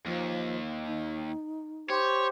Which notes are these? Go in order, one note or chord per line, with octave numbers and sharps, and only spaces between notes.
D#2 F3
D#4
G4 C5 C#5